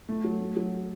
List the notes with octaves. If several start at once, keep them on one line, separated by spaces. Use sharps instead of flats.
A3
F#3
A3
F#3